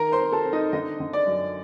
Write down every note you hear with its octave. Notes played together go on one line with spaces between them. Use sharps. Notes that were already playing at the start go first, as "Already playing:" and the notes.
Already playing: D#3 A#4 A#5
C5 C6
C4
A4 A5
C4
D#4 D#5
D3 D#4 D#5
D3
D5
F#2